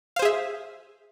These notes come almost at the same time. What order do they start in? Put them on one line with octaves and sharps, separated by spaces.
F5 C5 G#4 E5